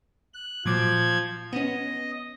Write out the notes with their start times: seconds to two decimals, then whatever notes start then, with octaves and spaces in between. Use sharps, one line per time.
0.34 F#6
0.65 A#2 F3 F#3 D6 G#6
1.53 B3 C#4 D#5